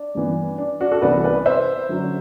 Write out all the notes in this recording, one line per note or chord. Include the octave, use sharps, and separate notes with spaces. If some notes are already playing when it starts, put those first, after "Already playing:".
Already playing: D4
G2 E3 B3
D4
D4 F#4
F#4 A4
C2 C3 E3 B3 B4 D5
B4 D5
C5 E5
F#2 D3 F#3